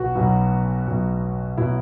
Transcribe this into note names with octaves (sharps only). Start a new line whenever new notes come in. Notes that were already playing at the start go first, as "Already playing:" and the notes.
Already playing: B1 B2 F#3 F#4
B1 B2 F#3
B1 B2 F#3
B2 F#3 E4